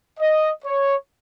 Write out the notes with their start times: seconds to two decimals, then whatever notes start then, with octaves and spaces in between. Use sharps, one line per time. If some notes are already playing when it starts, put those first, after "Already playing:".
0.19 D#5
0.64 C#5